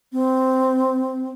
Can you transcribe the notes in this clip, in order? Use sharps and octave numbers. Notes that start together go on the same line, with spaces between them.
C4